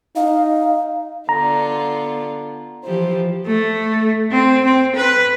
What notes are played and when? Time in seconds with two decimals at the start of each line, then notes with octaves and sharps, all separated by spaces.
0.16 D#4 F5
1.29 D3 B3 F4 A#5
2.84 E3 F3 G4 C5
3.47 A3
4.31 C4
4.64 C4
4.95 B4